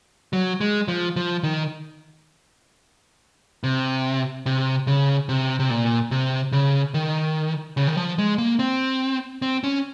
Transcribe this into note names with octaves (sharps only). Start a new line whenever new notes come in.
F#3
G#3
F3
F3
D#3
C3
C3
C#3
C3
C3
A#2
C3
C#3
D#3
C#3
D#3
F3
G#3
A#3
C4
C4
C#4